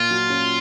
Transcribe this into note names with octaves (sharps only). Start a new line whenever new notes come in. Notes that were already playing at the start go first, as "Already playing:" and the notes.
Already playing: A#2 F4
F#3
C#4